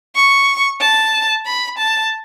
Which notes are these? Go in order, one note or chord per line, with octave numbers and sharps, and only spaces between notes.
C#6
A5
B5
A5